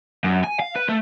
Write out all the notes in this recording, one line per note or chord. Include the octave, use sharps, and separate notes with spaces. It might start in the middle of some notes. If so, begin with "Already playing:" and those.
F#2
G#5
F5
B4
A3